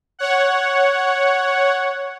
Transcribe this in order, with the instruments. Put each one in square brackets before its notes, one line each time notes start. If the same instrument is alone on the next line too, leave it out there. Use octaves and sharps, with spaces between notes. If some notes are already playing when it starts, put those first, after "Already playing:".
[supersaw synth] C#5 F#5